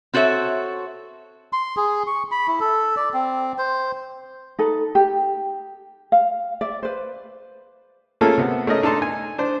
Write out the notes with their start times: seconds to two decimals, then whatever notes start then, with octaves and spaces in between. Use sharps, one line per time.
0.14 C4 F#4 A4 C#5 E5
1.53 C6
1.77 G#4
2.07 C#6
2.31 B5
2.48 E4
2.60 A4
2.96 D5
3.14 C4
3.58 C5
4.59 D#4 A4 B4
4.95 G4
6.12 F5
6.61 D5 E5
6.83 B4 C5
8.21 A3 A#3 C#4 F4 G#4 A4
8.38 C3 B3
8.67 A3 C#4 A#4 D#5
8.82 D4 D#4 A4 A5 C6
9.02 G#5
9.38 D4 C5